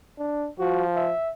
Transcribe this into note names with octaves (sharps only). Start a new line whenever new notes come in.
D4
F3 F#4
E5